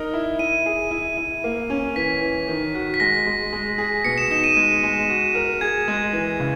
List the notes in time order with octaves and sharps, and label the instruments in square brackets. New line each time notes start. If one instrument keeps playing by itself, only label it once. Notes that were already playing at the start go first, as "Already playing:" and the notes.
Already playing: [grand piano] D#4 A#4
E4
[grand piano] E4 [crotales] D#7
[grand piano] G#4
E4
E4
A#3
C#4
[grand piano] E3 [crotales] B6
[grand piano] E3
D#3
F#4
[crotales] B6
[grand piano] G#3 [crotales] A#6
[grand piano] G#3
G#3
G#4
[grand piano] B2 [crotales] C#7
[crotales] E7
[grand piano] D#4 [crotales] E7
[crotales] D#7
[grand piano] G#3 [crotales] D#7
[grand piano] G#3
F#4
A#4
[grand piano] G#4 [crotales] G#6
[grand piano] G#3
E3
C#3